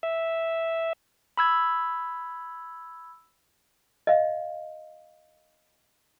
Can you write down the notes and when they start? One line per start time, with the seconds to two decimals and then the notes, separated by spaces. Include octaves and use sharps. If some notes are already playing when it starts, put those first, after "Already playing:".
0.03 E5
1.37 B5 E6 G#6
4.07 D#5 F5